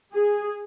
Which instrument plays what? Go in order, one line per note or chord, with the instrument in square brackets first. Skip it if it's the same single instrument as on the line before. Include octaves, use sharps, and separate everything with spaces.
[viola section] G#4